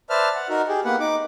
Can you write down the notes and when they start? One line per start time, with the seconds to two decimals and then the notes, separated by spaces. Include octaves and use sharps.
0.10 B4 C5 D5 E5 A5 F6
0.35 F#5
0.49 D#4 F#4 A#4
0.68 G4 G#4
0.84 A#3 B3 B4 F#5
1.00 D#4 D6